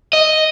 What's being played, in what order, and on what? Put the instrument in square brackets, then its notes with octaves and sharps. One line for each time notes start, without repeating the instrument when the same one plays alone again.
[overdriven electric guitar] D#5